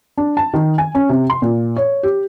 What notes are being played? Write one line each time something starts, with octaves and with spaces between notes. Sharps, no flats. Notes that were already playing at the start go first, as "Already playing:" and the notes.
D4
A5
D#3
G#5
C#4
C3
C6
A#2
C#5
G4